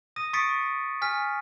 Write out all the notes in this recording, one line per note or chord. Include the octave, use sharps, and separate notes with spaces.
D#6 A#6 D#7
C#6 D#6 A6 B6 C#7 D7
G#5 F6 B6